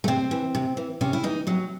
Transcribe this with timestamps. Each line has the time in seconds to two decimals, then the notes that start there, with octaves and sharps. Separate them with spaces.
0.04 A3
0.08 C3 C4
0.31 E3
0.55 C3
0.77 E3
1.01 C3 C#4
1.13 E4
1.23 E3 D#4
1.47 C3 F#3